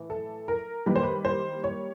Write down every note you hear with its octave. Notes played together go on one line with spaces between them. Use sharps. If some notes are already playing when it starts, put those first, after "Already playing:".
Already playing: A2 E3
A4
A#4
D#3 G3 A#3 B4
C5
B4
C5
C#5